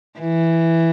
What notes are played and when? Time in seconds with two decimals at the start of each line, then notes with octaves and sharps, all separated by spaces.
0.19 E3